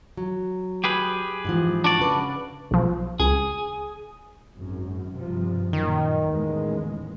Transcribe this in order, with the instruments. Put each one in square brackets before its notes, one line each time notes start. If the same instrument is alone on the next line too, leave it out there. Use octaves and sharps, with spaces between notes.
[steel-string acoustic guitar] F#3
[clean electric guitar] G4 G#4 B4
[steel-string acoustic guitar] G#2 E3 F3
[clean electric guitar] D4 F#4 D5
[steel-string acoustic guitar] C#3 B4
[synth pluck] B1 F3
[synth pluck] C#2 [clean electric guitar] G#4
[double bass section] G#1 F#2
G2 C3 F3
[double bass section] F#2 A#2 [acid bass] D#3
[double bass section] A1 E2 G#3